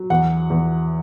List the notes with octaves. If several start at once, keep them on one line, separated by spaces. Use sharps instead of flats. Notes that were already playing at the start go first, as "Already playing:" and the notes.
Already playing: F#3
E2 F#5
E2